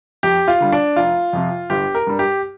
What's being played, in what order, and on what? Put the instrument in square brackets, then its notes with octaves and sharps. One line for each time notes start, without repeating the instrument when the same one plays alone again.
[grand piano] F2 G4
F4
D3 G3
D4
F1 F4
F2 C3 F3
G1 G4
A#4
G2 G3
G4